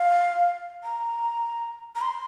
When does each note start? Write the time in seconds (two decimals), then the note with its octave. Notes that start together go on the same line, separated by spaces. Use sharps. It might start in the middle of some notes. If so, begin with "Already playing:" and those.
Already playing: F5
0.84 A#5
1.95 A#5
2.01 C6